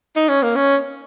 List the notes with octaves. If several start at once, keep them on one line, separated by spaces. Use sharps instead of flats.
D#4
C#4
A#3
C#4